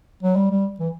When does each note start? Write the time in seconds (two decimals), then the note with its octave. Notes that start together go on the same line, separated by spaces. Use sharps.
0.23 F#3
0.36 G3
0.50 G3
0.79 E3